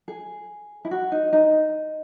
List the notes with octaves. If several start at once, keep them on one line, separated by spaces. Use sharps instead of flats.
G#4
E4
F#4
D#4
D#4